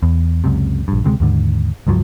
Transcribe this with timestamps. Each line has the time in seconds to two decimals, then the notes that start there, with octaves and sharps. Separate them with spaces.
0.03 E2
0.44 C#2 F#2 C3
0.88 A#1 G2
1.04 D2 C3 F3 G#3
1.20 D#2 G#2 D3
1.87 C#2 G2 F3 F#3